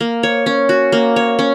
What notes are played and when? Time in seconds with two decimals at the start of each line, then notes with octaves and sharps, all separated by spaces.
0.01 A#3
0.23 C#5
0.46 C#4
0.69 F#4
0.92 A#3
1.16 C#5
1.39 C#4